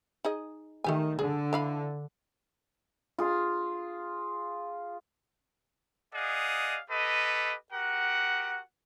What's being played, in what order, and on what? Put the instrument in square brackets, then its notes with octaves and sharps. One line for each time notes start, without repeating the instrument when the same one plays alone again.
[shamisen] D#4 G#4 D#5
[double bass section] D#3 [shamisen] A3 G4 G#5
[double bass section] D3 [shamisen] G#4
[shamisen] E3 F5 B5
[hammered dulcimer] F4 G#4
[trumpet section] G#4 D5 D#5 F5 F#5
G4 A4 B4 D#5
F#4 G4 A#4 F#5